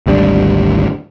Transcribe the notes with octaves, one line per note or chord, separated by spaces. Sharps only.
G#1 D2 G3 D4